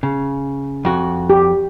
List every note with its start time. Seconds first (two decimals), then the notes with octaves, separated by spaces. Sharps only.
0.03 C#3
0.85 F2 F#4
1.30 G4